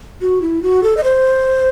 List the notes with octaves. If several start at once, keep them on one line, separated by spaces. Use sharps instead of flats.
F#4
E4
F#4
A4
D#5
C5